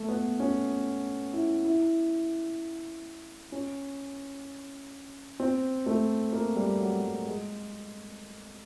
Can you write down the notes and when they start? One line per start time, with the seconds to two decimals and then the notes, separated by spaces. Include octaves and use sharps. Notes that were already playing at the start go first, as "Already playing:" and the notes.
Already playing: A3
0.09 B3
0.40 C#4
1.33 E4
1.64 E4
3.52 C#4
5.40 C4
5.86 A3
6.33 A#3
6.56 G3
6.80 F#3
7.03 G3
7.26 G#3